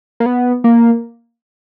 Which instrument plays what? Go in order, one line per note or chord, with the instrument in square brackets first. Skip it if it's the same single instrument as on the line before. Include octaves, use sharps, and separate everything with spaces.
[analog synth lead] A#3
B3
A#3